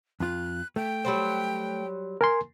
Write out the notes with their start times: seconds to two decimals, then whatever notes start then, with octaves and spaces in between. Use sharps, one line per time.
0.20 F2 F4 F#6
0.76 A3 G5
1.05 F#3 G3 C5
2.21 A#4 G#5 C6